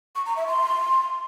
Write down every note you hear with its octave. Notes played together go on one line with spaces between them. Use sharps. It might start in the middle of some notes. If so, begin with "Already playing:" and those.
C#6
A#5
E5
C6